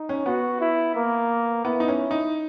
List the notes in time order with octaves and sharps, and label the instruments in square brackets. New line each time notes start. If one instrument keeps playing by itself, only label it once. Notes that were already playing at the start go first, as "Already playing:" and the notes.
Already playing: [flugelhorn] D#4
[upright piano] C#4
[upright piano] B3 [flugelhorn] F#4
[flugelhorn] E4
A#3
[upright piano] B3 [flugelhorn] E4
[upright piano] D#4
C#4
D#4